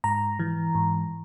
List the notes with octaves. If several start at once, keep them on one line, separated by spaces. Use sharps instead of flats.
G#2 A#5
E3
G#2